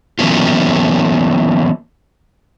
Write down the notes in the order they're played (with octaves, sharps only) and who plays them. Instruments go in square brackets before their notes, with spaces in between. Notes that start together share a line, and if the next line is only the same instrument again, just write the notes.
[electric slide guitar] E3 F#3 A#3 B3 C#4 F4